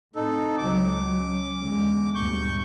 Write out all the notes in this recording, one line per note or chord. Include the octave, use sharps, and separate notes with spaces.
A2 C4 D#4 A4
C#2 F#3 D6
C#4
E2 D3 G#3
D2 G2 A#2 C#6 G6